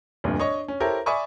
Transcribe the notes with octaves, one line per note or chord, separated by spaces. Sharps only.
F1 D2 G2 A#2
D4 C#5 D#5 C#6
C#4
E4 G4 A4 A#4 C5 C#5
D5 E5 G#5 B5 C#6 D#6